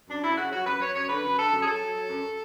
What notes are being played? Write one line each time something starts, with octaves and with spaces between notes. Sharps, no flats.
F#2 D4
F#2 E4
C#3 F#4
F#3 F#4
F#2 B4
F#3 C#5
F#2 C#5
D3 B4
F#2
D3 A4
F#2
G#4
F#3 A4
F#3
F#3
F#2